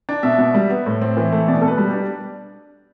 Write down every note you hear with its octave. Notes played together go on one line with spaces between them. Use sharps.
D4
B2 E5
B2
G3
B3
A2
C4
E3
A3
B2 D5
B2 A4
B4
G3
G4
D4